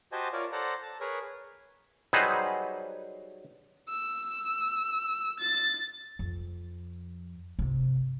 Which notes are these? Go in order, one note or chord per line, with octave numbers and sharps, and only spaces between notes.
F#4 G4 C5 D#5 G#5 A5
F4 A#4 C#5 D5
A4 C5 D5 F#5 A#5
A5
G#4 A#4 B4 C#5
F#3 G3 D#4 G#4 B4 C5
E6
A6
F2
G1 C3